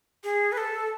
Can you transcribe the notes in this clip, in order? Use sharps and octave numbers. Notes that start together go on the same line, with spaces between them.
G#4
B4
A4